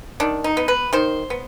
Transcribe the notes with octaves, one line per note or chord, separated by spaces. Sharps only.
D#3 D4
D#4
B3
B4
D#3 C5
B3